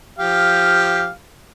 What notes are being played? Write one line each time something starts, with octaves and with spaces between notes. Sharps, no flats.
F3 G4 F5